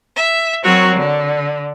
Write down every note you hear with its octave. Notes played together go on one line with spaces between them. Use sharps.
E5
F#3 C4 F#4 A#4 C#5
D3